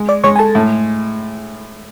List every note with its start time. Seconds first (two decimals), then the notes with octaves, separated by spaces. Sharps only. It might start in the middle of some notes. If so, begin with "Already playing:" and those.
Already playing: G#3
0.09 D5 D6
0.24 G#3 C#5 C#6
0.36 G#5
0.39 A4 A5
0.55 A2